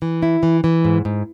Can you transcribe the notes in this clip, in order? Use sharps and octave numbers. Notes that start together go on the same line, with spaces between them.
E3
E4
E3
E3
G#2
G#2